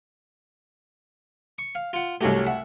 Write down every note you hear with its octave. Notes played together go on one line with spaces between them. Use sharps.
C#6
F5
F4 F#5
C2 F#3 A3 F#4 G4
E5 F#5